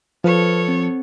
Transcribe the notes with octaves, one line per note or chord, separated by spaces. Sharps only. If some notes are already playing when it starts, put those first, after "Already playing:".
F3 A4 B4 C#5
C4